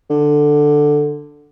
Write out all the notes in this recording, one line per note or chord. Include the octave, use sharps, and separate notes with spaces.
D3